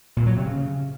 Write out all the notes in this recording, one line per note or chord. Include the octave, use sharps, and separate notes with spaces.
A#2
F#3
C3
C#3